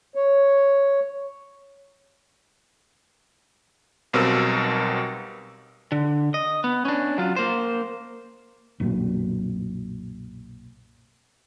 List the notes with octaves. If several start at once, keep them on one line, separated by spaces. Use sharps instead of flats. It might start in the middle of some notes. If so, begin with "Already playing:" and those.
C#5
B1 B2 G3 C4 A#4 E6
D3
D#5
B3
C#4 D4
F#3 F4
A#3 C5
B1 F#2 A#2